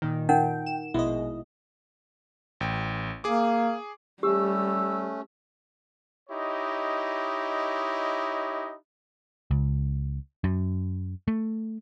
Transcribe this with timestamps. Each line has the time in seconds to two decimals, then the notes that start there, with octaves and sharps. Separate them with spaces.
0.02 A#2 D#3
0.29 D#4 A#4 F#5 G5
0.66 E7
0.94 A#1 B2 G#3 E4 D#5
2.60 A1 G5
3.24 A#3 G#4 D6
4.23 G3 A3 C#4 G4 E6
6.29 D#4 E4 G4 C#5 D#5
9.51 C#2
10.44 F#2
11.28 A3